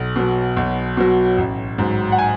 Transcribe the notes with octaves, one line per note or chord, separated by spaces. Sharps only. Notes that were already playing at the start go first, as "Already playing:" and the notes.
Already playing: B1
B2 F#3
B1
B2 F#3
A1
G#2 F#3
F#5
G#5